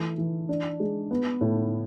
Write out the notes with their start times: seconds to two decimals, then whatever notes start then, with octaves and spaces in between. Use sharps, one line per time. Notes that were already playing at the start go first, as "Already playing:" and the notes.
Already playing: E3 A3
0.18 E3
0.49 D4
0.80 G#3
1.11 B3
1.41 A2